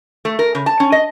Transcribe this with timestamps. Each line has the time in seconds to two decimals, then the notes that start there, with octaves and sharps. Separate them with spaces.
0.25 A3
0.39 A#4
0.55 C#3
0.66 A5
0.80 C#4
0.92 D#5